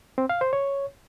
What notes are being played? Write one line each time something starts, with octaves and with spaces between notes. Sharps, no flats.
C4
F5
C5
C#5